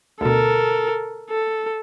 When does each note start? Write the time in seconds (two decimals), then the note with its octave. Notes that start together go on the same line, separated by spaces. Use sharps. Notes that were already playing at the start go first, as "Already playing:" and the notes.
0.21 D2 B2 A4 A#4
1.30 A4